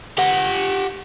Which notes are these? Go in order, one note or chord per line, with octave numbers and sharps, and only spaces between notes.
G4 F#5